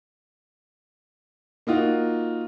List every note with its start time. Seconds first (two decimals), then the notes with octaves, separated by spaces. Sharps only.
1.67 A#3 D#4 F4 F#4